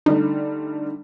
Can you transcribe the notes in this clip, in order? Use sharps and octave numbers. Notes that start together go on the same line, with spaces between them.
D3 G3 A3 D#4